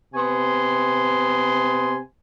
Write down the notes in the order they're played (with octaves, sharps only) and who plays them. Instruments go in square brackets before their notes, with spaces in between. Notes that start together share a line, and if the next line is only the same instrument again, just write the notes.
[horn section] C3 B3 G#5 C6